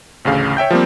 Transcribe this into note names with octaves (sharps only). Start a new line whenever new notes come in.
A1 D2 C#3 F5
C#5 E5 G5 G6
F3 G3 A#3 C4